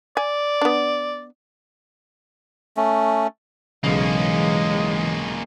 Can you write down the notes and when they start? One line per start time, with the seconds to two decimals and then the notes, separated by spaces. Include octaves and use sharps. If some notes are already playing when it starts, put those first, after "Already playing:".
0.17 D5 G#5
0.62 B3 D4
2.77 A3 C#4
3.84 B1 C#3 E3 G#3 A#3 C#4